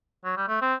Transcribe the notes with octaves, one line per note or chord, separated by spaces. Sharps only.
F#3
G3
A3
C4